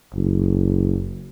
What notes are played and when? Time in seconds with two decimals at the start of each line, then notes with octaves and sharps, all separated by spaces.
0.14 F#1